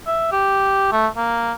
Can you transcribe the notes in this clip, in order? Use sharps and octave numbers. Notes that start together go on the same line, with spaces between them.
E5
G4
A3
A#3